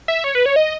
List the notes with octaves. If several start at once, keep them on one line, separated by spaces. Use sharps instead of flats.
E5
C#5
B4
C#5
D#5